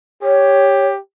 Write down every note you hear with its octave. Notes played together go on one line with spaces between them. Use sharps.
G4 C#5